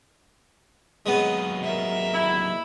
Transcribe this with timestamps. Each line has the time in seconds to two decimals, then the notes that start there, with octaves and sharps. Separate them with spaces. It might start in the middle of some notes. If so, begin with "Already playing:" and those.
1.06 D#2 F#3 G#3 B3
1.62 A#4 E5
2.14 E4